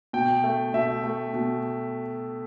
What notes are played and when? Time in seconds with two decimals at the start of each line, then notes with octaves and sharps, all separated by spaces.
0.13 B2 G5
0.44 A3
0.74 B2 E5
1.04 A3
1.34 B2